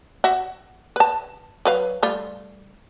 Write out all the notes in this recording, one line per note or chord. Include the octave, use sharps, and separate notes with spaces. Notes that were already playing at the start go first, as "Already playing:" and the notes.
F#4 E5
B4 A5
F#3 B4 F5
G3 A3 F4